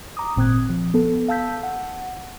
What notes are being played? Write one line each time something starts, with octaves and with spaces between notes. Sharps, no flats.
A#5 D6 D#6
G#1 A#2 C4 D#6 F#6 G#6
F3
B3 A4
F5 A5 E6 G6 B6
F#5